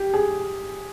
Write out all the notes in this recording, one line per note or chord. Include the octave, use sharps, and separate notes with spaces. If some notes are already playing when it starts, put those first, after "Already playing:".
Already playing: G4
G#4